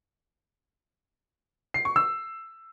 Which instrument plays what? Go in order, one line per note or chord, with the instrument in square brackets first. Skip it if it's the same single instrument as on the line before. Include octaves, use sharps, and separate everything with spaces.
[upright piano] C7
C#6
E6